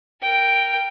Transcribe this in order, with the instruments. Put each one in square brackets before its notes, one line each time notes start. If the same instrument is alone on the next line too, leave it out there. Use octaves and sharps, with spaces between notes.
[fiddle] A#4 G5